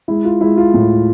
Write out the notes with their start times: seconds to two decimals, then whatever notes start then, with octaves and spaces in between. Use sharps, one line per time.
0.08 G#3 E4
0.25 F4
0.41 G#3 E4
0.57 F4
0.74 A2